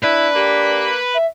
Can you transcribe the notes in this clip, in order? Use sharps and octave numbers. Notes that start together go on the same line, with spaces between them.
D4 E4 B4
A#3 G4
E5